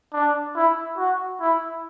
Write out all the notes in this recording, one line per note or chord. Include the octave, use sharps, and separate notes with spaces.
D4
E4
F#4
E4